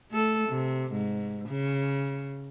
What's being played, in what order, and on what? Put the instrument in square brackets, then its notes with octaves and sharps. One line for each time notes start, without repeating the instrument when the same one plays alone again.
[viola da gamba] A3 A4
C3
G#2
C#3